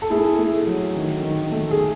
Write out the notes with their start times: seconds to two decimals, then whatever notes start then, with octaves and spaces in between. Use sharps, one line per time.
0.02 A4
0.10 A3 E4 G#4
0.38 A3
0.67 F#3
0.96 D#3
1.23 D#3
1.52 A3
1.71 G#4